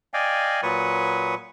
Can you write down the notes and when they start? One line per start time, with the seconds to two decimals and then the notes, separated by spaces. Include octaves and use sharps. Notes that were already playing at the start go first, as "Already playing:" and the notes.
0.14 D5 D#5 F5 G5 G#5
0.63 A#2 F#3 B4 C#6 D#6